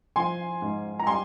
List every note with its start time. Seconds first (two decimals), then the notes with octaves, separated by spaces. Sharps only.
0.16 F3 G#5 C6
0.62 G#2
0.99 A#5
1.06 G3 G#5 C6